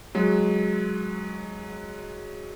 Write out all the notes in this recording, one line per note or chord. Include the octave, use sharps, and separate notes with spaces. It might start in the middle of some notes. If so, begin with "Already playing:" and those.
F#3 G#3